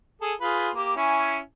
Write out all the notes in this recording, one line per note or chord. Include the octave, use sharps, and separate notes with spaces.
G#4 A4
F4 G#4 B4
A#3 G4
C#4 E4 G#5